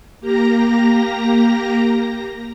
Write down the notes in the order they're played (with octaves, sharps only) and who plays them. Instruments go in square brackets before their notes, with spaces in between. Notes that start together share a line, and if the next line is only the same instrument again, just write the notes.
[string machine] A#3 G4 A#5 A#6